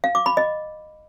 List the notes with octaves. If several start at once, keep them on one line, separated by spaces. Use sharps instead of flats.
F5
D6
B5
D#5